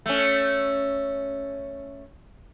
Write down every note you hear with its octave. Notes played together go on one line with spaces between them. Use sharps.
A3 C#4